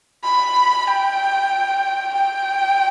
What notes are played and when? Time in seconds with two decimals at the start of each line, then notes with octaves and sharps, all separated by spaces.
0.24 B5
0.87 G5
2.14 G5